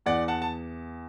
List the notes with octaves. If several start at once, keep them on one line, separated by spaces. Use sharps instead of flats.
E2 D5 F#5
F#5 A5
A5